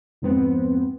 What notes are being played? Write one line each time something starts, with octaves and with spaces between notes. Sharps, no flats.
F2 G#2 B3 C4